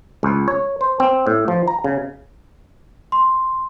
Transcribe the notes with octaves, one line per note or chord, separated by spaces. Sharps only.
C#2
C#5
C5
C4
A2
F3
A#5
C#3
C6